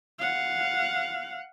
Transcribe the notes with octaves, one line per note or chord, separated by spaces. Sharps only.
F5 F#5